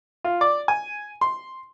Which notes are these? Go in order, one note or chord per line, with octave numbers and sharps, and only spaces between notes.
F4
D5
G#5
C6